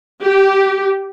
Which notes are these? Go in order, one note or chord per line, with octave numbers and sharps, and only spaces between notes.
G4